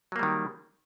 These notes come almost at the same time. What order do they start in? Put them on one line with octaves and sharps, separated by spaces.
F#3 A#3 G3 D#3